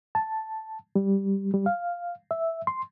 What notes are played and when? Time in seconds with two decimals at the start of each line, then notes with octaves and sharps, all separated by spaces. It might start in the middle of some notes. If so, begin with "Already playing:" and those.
0.15 A5
0.95 G3
1.54 G3
1.66 F5
2.31 E5
2.67 C6